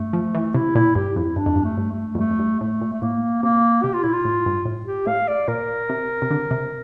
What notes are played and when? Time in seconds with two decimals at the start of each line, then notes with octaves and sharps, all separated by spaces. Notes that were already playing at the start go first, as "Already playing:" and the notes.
Already playing: G2 A3
0.13 F3
0.35 E3
0.54 C3 E4
0.75 A#2 E4
0.95 G2 G4
1.16 F2 E4
1.36 G2 D4
1.46 F2
1.56 G2
1.64 A3
1.77 G2
1.92 A3
2.15 F2
2.19 G2 A3
2.31 F2
2.39 G2
2.60 A2 A3
2.81 A#2
2.93 A3
3.02 A2 A#3
3.43 C3 A#3
3.83 C3 G4
3.93 F4
4.03 A#2 E4
4.13 F4
4.25 A2
4.46 G2
4.65 A2
4.86 G4
5.07 A2 F5
5.28 D5
5.48 A#2 A#4
5.89 C3
6.22 C3
6.31 D3
6.51 C3